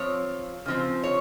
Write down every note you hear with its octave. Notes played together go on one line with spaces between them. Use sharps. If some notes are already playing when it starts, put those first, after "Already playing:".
Already playing: F3 C4 C#5
C#3 F3 C4
C#5